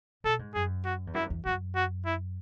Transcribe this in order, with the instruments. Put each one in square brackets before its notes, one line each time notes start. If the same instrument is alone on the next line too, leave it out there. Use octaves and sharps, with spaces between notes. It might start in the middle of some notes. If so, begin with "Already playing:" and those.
[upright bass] B2 [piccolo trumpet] A4
[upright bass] G#2
[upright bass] F#2 [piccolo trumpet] G#4
[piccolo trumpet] F#4
[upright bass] E2
[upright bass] F#2 [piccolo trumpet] E4
[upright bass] E2
[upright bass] F#2 [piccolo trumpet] F#4
[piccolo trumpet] F#4
E4